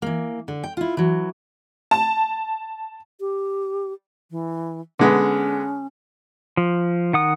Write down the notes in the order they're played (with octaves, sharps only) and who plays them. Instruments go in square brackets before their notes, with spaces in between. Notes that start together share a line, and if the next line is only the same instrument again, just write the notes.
[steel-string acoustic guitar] E3 A#3
D3
G5
E4 F4
E3 F#3
[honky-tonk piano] A5
[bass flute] G4
E3
[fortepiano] D3 G#3 B3 [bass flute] C#4
[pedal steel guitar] F3
D#3 F#5 D#6